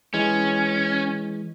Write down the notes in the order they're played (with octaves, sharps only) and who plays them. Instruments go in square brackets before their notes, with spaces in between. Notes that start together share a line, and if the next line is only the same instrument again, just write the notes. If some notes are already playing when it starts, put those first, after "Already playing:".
[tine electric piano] E3 G#3 [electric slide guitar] C#4